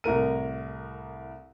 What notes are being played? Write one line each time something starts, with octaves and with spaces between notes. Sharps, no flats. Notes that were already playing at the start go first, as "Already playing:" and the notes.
C2 A2 A#4 D#7